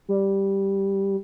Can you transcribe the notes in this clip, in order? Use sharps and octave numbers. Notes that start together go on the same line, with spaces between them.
G3